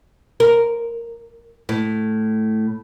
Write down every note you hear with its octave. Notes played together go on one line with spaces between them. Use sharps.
A#4
A2